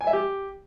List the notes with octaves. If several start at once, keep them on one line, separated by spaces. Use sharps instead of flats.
G#5
E5
G4